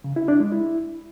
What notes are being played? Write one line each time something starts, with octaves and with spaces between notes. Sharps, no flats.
C#3
E4
D4
G#3
E4